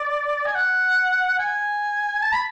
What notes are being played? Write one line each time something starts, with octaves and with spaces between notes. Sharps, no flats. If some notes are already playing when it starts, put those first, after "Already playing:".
Already playing: D5
G#5
F#5
G#5
A5
B5